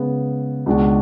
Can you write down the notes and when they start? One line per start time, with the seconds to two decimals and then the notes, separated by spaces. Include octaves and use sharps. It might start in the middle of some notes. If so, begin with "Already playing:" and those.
Already playing: C#3 G#3 B3
0.66 C#2 B2 G#3 D4 F#4